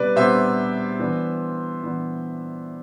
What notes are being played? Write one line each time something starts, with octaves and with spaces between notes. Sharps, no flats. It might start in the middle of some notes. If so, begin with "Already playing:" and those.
Already playing: C3 G3 B3 D4 B4 D5
C3 G3 B3 D4 C5 E5
E3 B3 D4
E3 B3 D4